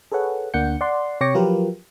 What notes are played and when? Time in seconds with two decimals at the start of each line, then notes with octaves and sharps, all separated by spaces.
0.12 G#4 A4 B4 C#5 F#5
0.54 D2 A#3 D4 F#5 G6 C#7
0.81 D5 F#5 C6
1.21 C3 C#5 G5 D6 A#6 C#7
1.35 F3 F#3 F4 G4 A#4 B4